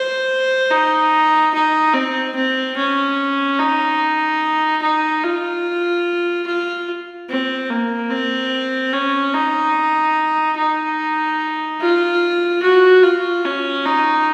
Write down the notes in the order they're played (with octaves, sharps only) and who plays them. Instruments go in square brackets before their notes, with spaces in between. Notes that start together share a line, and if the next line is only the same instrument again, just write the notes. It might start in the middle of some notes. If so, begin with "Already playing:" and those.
Already playing: [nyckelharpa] C5
D#4
D#4
C4
C4
C#4
D#4
D#4
F4
F4
C4
A#3
C4
C#4
D#4
D#4
F4
F#4
F4
C#4
D#4